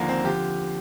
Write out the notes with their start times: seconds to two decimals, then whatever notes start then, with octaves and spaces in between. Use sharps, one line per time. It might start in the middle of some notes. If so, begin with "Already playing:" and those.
Already playing: D#2 D3 F3 A#3
0.08 C4
0.24 D3 F3 G4